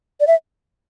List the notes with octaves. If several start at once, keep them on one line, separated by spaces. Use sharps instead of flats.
D5
E5